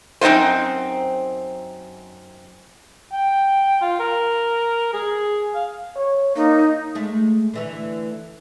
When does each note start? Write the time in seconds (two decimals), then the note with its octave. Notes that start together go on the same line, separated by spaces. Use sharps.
0.21 F#2 C4 D#4 F4 C5
3.13 G5
3.82 F4
4.00 A#4
4.94 G#4
5.55 F5
5.97 C#5
6.36 A#3 D#4
6.95 G#3 A3
7.54 D3 E3 A3